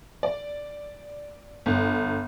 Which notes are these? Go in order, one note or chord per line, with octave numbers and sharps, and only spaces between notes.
D5
G1